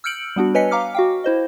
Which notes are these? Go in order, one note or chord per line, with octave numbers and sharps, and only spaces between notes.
E6 F6 G6 C#7 D7 F#7
G3 B3 D4 F#4
B4 C#5 D#5 G#5 B6 C#7
F5 A#5 D6 F6
F#4 F5 G5
E4 C5 D#5